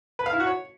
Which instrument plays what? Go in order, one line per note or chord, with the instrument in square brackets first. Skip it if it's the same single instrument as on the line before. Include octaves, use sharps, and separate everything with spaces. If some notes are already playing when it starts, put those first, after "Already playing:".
[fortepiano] B4
F5
E4
F#4
C#5